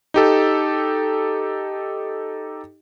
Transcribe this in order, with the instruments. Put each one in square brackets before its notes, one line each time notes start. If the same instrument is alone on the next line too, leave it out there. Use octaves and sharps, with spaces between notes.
[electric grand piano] D#4 G4 A4